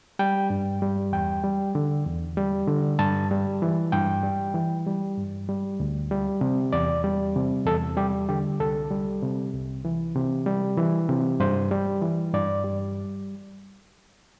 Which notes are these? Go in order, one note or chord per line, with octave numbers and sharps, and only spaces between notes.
G3 G5
G2
G3
E2 G5
G3
D3
E2
G3
D3
G2 A5
G3
E3
G2 G5
G3
E3
G3
G2
G3
D2
G3
C3
E2 D5
G3
C3
E2 A4
G3 G4
D3 G4
C2 A4
G3
C3
C2
E3
C3
G3
E3
C3
G2 C5
G3
E3
G2 D5
G3